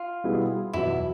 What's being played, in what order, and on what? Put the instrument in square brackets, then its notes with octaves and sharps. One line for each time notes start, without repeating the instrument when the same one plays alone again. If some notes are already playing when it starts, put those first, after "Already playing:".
Already playing: [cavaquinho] F4
[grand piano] B2 G3 B3 E4 G#4
[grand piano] E2 B2 F#3 [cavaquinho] E4